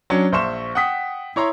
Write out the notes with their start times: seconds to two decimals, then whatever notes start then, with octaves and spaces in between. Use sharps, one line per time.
0.10 F#3 C#4 D4
0.32 A#1 C5 E5 C6 C#6 E7
0.75 F#5 G5 D#6 B6
1.36 E4 C#5 A#5 C6